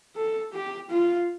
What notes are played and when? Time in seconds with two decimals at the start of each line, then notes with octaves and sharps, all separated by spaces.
0.16 A4
0.53 G4
0.90 F4